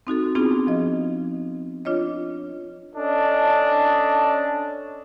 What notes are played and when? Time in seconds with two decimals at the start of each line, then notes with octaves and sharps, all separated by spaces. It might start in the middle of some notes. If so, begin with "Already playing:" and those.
0.07 C4 D#4 F#4 A4
0.35 B3 C4 D4 D#4 F4 G#4
0.67 F3 D#5
1.85 D4 F4 C#5 D#5
2.95 C#4 D4 A4 D#5